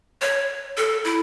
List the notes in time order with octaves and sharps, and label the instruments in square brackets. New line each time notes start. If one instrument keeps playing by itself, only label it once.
[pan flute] C#5
A4
E4